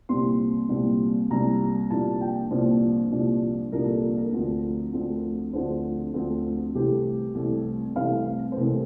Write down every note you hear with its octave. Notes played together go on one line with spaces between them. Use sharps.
C2 A#2 G3 C4 C6
C2 A#2 G3 C4
C2 A#2 G3 C4 A#5
C2 A#2 F3 A#3 D4 A5
G5
C2 A#2 F3 A#3 D4 C5
C2 A#2 F3 A#3 D4
C2 A#2 F3 A#3 D4 A#4
A4
A#4
A#4
D2 D3 F3 C4
D2 D3 F3 C4
D2 D3 F3 C4 C5
D2 D3 F3 C4
C2 C3 E3 A3 C4 G4
C2 C3 E3 A3 C4
C2 C3 E3 A3 C4 F5
C5
C2 C3 E3 A3 C4 A#4